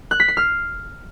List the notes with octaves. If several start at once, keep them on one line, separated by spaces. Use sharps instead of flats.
F#6
B6
C7
F6